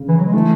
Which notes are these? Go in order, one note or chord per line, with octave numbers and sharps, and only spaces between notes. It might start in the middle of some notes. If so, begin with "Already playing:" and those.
Already playing: C#3
E3
F#3
G#3
E3 A3